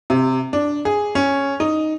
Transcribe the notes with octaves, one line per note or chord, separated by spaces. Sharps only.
C3
D4
G#4
C#4
D#4